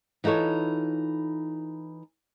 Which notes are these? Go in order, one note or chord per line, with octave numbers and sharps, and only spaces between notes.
E3 D#4 F4 A4 C#5